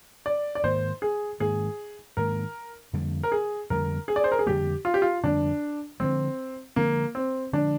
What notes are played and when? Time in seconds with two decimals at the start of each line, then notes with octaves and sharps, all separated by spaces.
0.26 D5
0.55 D5
0.64 G#2 D#3 A#3 C5
1.02 G#4
1.40 G#2 D#3 A#3 G#4
2.17 G#2 D#3 A#3 A#4
2.93 F2 D3 G3 A#3
3.23 A#4
3.32 G#4
3.70 F2 D3 G3 A#3 A#4
4.08 G#4
4.16 D5
4.24 C5
4.32 A#4
4.39 G#4
4.46 F2 D3 G3 A#3 G4
4.85 F4
4.94 G4
5.02 F4
5.23 F2 D3 G3 A#3 D4
6.00 D3 F3 G#3 C4
6.76 D3 F3 G#3 A#3
7.15 C4
7.53 D3 F3 G#3 D4